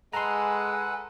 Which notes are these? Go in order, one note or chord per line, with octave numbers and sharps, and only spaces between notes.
G#3 A4 B4 F#5 G#5 A#5 C6